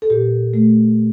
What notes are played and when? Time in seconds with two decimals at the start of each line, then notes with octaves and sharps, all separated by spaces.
0.02 A4
0.10 A#2 G4
0.54 A3